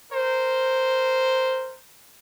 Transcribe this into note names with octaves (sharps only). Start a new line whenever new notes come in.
A#4 C5